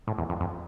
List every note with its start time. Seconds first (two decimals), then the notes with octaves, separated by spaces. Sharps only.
0.07 A2
0.18 E2
0.29 F2
0.41 F2